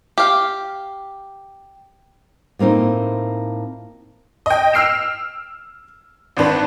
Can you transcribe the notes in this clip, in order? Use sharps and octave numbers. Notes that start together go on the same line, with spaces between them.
G4 F5
A2 A#3 C4 D#4 F4
D#5 G5
E6 F6 C7 D7 E7
G#1 C4 D4 B4